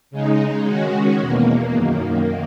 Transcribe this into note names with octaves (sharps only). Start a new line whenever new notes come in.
C#3 G#3 D#4
D#3 G#3 C#4 F#4
E2 B2 A#3
F#2 D#3 A#3